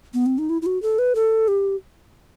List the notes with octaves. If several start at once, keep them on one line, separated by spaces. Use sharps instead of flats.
B3
C4
D#4
E4
E4
F#4
A4
B4
A4
G4